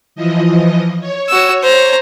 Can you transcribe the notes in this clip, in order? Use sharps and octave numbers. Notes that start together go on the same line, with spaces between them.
E3 F3 D#5
C#5
F#4 E6
C5 A#5